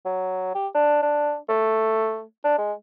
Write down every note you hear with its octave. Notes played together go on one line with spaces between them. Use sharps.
F#3
G4
D4
D4
A3
D4
G#3